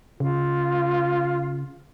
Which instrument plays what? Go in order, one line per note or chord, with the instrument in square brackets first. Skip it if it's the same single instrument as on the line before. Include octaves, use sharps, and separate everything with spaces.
[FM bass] C#3 [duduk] F4